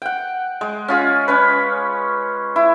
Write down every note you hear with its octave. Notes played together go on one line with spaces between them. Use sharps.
F#5 G5
G#3
C#4 F4 G#4
C#4 B4
E4